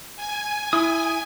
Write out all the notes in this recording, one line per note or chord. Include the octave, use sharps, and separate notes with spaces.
G#5
E4 D#6